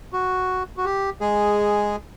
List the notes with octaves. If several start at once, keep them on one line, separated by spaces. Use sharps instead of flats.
F#4
F#4
G4
G#3 G#4